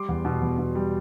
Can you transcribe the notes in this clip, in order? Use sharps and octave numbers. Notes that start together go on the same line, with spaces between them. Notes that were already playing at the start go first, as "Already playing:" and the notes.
Already playing: G3 C6 D6
E2
B2
E2
B2
G3